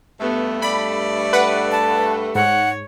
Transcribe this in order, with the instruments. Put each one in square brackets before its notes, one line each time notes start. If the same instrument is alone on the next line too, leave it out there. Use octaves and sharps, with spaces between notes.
[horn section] G2 A3 [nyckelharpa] B3
[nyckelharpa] D5 [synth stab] B5
[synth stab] B4 F#5
[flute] A5
[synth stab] G#2 [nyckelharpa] C#5 [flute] F#5